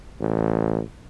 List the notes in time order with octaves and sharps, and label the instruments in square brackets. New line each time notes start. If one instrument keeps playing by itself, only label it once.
[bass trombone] A1